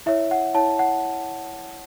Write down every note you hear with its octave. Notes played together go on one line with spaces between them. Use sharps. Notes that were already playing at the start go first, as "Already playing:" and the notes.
E4 C#5 E5
F#5
E4 C#5 A5
F#5